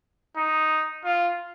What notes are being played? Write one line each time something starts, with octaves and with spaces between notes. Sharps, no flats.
D#4
F4